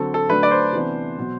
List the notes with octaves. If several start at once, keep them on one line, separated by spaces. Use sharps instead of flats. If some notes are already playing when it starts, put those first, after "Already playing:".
Already playing: D3 F#3 C4 A4
A4
D3 F#3 A3 D4 B4
D5
C5
C3 E3 B3 D4
B2 F#3